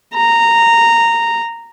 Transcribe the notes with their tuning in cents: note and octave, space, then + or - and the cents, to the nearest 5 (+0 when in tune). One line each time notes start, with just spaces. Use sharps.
A#5 -10